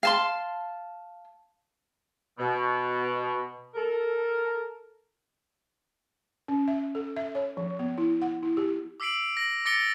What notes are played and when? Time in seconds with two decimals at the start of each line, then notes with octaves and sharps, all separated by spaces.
0.03 F5 A5 C6
2.39 B2
3.75 A4 A#4
6.48 C#4
6.68 E5
6.95 A4
7.17 E5
7.35 C#5
7.57 F3
7.79 B3
7.98 E4
8.22 F#5
8.42 E4
8.57 G4
9.00 D6 E6 B6 C7 D7 F#7
9.37 A#6 F#7
9.65 D6 A6 A#6 C#7 D7 G7